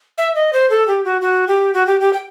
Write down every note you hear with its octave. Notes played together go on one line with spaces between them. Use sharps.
E5
D#5
C5
A4
G4
F#4
F#4
G4
F#4
G4
G4
G5